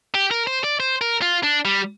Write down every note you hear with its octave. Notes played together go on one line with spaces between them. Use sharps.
G4
A#4
C5
D5
C5
A#4
F4
D4
G3